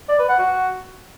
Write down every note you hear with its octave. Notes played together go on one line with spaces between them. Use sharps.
D5
B4
F#5
F#4